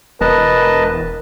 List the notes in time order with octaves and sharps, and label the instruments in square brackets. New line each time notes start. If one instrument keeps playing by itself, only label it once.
[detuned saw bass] E1 [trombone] A#4 [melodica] B4 D#5 A5